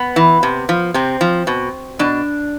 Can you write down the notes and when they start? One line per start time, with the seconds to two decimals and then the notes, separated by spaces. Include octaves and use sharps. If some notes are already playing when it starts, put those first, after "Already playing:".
Already playing: B3
0.16 E3
0.43 C3
0.69 F3
0.94 C3 C4
1.21 F3
1.47 B2
1.99 B2 D4